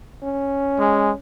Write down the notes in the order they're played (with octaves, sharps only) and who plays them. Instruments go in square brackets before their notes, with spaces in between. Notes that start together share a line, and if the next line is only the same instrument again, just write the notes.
[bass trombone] C#4
[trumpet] G#3